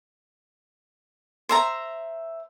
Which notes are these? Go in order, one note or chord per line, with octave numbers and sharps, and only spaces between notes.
C5 E5 A#5